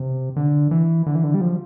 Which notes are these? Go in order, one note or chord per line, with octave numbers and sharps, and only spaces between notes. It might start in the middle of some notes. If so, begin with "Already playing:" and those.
Already playing: C3
D3
E3
D3
E3
D3
G3
F3